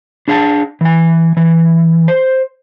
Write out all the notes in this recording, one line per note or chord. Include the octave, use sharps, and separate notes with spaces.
D4 G#4 F5 G#5 A5
E3 G#5
E3
C5